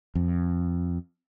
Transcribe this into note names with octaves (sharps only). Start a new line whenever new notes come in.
F2